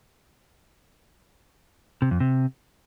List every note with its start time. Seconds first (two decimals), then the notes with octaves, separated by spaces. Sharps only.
2.02 C3
2.11 F2
2.20 C3